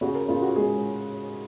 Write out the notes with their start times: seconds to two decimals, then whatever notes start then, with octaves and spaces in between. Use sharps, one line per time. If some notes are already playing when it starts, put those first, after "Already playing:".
0.01 C#3 F#4
0.15 A#4
0.28 C#3 F4
0.42 F#4
0.56 G#3 G#4